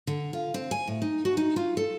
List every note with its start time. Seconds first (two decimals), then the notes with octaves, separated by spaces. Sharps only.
0.07 D3
0.33 F4
0.54 C4
0.71 G#5
0.88 A2
1.02 D#4
1.25 F#4
1.37 D#4
1.56 F4
1.77 A4